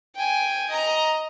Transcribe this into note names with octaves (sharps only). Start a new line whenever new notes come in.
G5 G#5
D#5 A#5